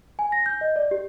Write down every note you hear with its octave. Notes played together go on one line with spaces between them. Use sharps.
G#5
A#6
G6
D#5
D5
G4